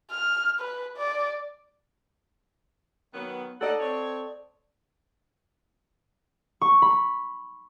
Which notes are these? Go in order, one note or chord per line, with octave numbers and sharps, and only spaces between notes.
F6
B4
D5
D#3 F#3 B3
D#4 A4 D5 D#5 F#5
C4 C#5
C#6
B5